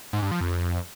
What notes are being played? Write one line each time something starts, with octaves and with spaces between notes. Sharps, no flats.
G#2
G2
F3
F2